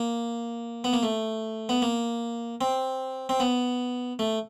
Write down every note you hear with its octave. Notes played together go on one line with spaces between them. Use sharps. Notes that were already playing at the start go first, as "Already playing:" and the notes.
Already playing: A#3
B3
A#3
A3
B3
A#3
C4
C4
B3
A3